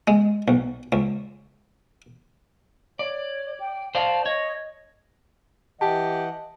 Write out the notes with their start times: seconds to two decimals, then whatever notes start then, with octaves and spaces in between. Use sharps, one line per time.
0.08 G#3
0.48 B1
0.92 C#2
2.99 C#5 D5
3.60 G5
3.95 C5 D5 F5 A5
4.26 C#5 D#5
5.81 E3 G4 D#5 F#5 A5